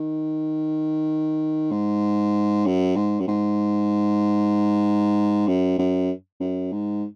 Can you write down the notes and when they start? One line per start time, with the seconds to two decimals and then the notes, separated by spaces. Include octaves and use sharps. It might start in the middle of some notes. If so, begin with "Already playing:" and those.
Already playing: D#3
1.72 G#2
2.66 F#2
2.96 G#2
3.20 F#2
3.28 G#2
5.47 F#2
5.79 F#2
6.40 F#2
6.72 G#2